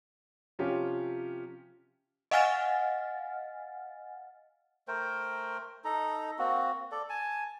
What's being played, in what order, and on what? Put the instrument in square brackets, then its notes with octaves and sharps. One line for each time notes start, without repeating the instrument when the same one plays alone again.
[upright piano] C3 F3 C#4 F4 G4
[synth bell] D#5 F5 F#5 G#5 F6 A6
[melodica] A3 A#4 C5 G5
D#4 A4 A#5
A#3 C4 F#4
A4 D5
G#5 A5